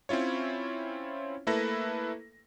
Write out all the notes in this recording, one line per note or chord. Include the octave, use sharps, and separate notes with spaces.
C4 C#4 E4 F4 C#5
A3 A#3 E4 A4 B4 A#6